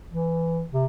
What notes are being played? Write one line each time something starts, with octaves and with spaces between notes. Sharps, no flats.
E3
C3